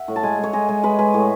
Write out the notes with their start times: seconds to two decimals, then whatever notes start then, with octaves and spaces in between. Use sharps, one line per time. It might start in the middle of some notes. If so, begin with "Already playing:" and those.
Already playing: E5 F#5
0.08 A2
0.16 A5
0.23 G#3 G#5
0.38 G#3
0.43 C#5
0.53 G#3 D#5
0.68 G#3 C#5
0.83 G#3 B4
0.99 G#3 B4
1.14 A2